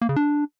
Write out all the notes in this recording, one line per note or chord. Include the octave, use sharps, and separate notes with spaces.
A#3
C#3
D4